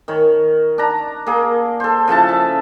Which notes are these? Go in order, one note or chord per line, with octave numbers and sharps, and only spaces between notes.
D#3 C#5
D4 A#5
A#3 G#4
A4 C5
C#3 F3 E4 A5
E5